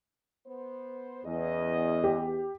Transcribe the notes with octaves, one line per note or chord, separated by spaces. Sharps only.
B3 C5
E2 C#4 G#4 D#5
G4